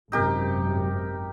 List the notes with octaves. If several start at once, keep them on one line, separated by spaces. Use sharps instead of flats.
G#1 F#2 C3 D#4 G4 A#4